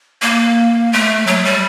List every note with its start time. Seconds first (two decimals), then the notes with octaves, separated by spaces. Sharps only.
0.22 A#3
0.93 A3
1.27 F#3
1.45 G3